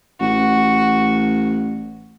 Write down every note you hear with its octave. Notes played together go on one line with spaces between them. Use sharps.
A1 F#4